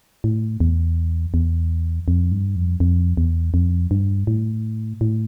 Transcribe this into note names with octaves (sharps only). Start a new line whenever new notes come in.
A2
E2
E2
F2
G2
F2
F2
E2
F2
G2
A2
A2